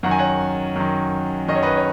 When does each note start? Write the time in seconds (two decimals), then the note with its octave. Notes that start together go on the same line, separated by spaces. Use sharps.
0.03 F#2 D#3 F#5
0.11 G#5
0.19 C#5 F#5
0.76 F#2 D#3
1.48 F#2 D#3 D#5
1.55 C#5
1.63 B4 D#5
1.77 C#5